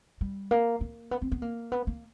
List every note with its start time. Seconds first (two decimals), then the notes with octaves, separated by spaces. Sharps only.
0.21 G3
0.51 A#3
0.81 A#3
1.11 B3
1.22 C4
1.32 B3
1.42 A#3
1.72 B3
1.87 A#3